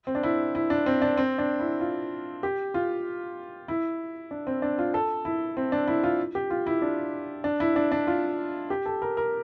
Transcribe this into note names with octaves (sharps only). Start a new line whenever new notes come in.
C4
D4
E4
E4
D4
C4
D4
C4
D4
E4
F4
G4
F4
E4
D4
C4
D4
F4
A4
E4
C4
D4
E4
F4
G4
F4
E4
D4
D4
E4
D4
D4
F4
G4
A4
A#4
A#4